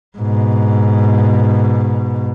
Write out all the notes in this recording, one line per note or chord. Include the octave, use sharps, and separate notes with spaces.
G#2 B2